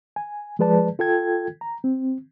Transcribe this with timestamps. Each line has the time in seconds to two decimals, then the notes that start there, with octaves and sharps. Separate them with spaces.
0.16 G#5
0.59 F3 G#3 G#4 B4 D5 A5
0.99 F4 A4 G5 G#6
1.61 A#5
1.84 C4